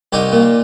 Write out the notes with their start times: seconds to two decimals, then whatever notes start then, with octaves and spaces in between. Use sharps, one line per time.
0.12 C2 D#4 G4
0.32 A#2